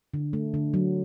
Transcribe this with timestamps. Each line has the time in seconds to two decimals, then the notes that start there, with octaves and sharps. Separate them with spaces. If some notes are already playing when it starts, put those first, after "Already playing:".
0.14 D3
0.33 A3
0.54 D3
0.74 F#3